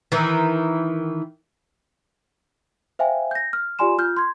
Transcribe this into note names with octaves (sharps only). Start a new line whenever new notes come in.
D#3 E3
C5 E5 F5 G5 G#5
G6 A#6
F6
F4 G4 D5 G#5 C6 E7
F4 F6 G6
C6 G#6